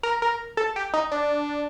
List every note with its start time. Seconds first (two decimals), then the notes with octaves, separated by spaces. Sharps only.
0.03 A#4
0.22 A#4
0.57 A4
0.76 G4
0.93 D#4
1.11 D4